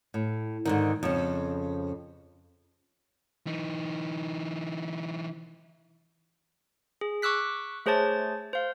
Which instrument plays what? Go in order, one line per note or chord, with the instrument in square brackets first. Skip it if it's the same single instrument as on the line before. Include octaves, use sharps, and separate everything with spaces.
[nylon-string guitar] A2
G#2 D3 D#3
F2 C#3
[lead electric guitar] E3 D#4
[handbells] G#4
C#6 D6 E6 F#6 B6
A3 G#4 C5 C#5 A5 A6
C5 F5